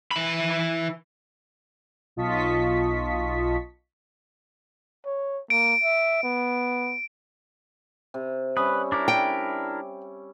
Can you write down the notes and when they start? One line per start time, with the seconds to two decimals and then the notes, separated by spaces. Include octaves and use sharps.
0.11 E3 B5
2.16 B1 F4 D#5 A5 C#6 B6
5.05 C#5
5.50 A#3 D7
5.84 E5
6.23 B3
8.14 C3
8.57 G3 C#4 B4 E5 D#6
8.92 D4 E4 A#4 D6
9.08 G5